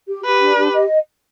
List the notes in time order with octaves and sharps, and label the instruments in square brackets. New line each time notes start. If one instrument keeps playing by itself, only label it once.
[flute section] G4
[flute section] G4 [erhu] B4
[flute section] D4
G4
D#5